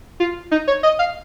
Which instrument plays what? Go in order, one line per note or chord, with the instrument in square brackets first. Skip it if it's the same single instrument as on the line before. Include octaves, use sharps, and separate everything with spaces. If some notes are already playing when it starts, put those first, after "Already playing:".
[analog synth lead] F4
D#4
C#5
D#5
F5